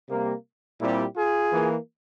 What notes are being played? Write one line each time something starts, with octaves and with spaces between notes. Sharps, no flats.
C3 G3 A#3
A#2 G3 C4 E4 G4
F4 G#4
E3 A#3